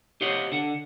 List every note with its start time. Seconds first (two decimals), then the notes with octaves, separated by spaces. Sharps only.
0.21 G4 C5 C#5 D#5 F5 F#5
0.52 D3 F#5